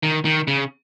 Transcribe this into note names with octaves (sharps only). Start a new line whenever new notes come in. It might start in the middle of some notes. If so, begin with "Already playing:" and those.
D#3
D#3
C#3